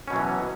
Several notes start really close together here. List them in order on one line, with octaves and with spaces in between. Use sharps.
C#4 B2 F#3 E3